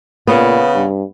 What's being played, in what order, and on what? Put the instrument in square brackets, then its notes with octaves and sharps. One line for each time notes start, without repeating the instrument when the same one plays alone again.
[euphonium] A#2 [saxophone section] C#3 [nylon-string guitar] B3
[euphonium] G2